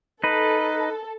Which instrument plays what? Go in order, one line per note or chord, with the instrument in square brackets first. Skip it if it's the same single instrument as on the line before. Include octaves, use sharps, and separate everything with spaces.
[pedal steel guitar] D#4 B4 [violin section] A4